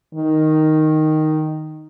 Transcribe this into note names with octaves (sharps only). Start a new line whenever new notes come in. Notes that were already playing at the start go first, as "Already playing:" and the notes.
D#3